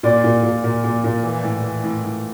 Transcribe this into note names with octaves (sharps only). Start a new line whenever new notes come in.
A#2 D5
A#2
A#2
A#2
A#2
A#2
E3
A2
E3
A2
A2